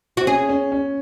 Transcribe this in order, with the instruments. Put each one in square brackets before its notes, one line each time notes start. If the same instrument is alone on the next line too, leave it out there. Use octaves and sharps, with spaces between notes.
[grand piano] C4 [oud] F#4
[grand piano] C#4 [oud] G#4
[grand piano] C#4
C#4